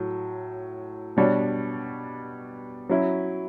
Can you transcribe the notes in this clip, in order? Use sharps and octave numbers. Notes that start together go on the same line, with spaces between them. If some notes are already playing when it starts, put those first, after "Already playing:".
Already playing: A2 F#3
B2 G3 D4 F#4 C#5
F#3 C#4 E4